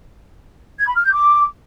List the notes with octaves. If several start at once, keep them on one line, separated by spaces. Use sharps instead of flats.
G#6
B5
F6
G6
D6